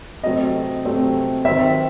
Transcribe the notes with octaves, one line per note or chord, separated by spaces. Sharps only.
C3 F#3 A3 C4 D#5
C3 F#3 A3 C4
D#3 F#3 C4 E5